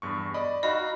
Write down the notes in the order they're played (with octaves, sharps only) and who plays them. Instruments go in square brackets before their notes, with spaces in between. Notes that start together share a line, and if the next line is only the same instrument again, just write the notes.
[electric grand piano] E2 G2 C#6
D5 D#5 B5
[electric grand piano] D#4 F#4 [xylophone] D#5 [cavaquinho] F5 B5 D#6